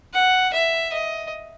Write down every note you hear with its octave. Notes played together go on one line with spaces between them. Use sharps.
F#5
E5
D#5